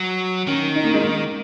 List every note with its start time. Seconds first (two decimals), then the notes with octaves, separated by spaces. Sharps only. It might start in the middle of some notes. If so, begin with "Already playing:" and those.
Already playing: F#3
0.47 D#3 C#4
0.76 D#4
0.84 A#3
0.94 G#3
1.03 A#3